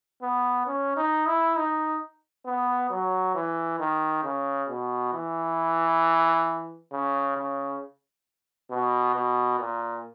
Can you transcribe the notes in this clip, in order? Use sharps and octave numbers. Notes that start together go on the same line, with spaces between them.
B3
C#4
D#4
E4
D#4
B3
F#3
E3
D#3
C#3
B2
E3
C#3
C#3
B2
B2
A#2